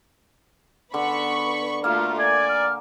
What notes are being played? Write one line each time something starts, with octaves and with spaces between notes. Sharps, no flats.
D3 B3 B5 C#6
A3 A#3 F4 F#4 A#4 F6
D5 G#5 G#6
F6